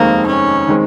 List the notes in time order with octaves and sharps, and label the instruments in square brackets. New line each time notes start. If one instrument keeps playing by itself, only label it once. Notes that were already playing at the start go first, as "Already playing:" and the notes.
Already playing: [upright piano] F1 D#2 D#3 G#3 C4 [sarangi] A#3
[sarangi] C#4
[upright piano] D#3 G#3 C4